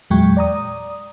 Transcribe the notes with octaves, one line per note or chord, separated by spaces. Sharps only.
E2 A#2 F#3 G#3 G5 C#6
D5 A#5 D#6